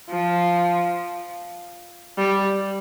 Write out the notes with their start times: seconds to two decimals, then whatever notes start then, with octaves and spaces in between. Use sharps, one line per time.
0.10 F3
2.17 G3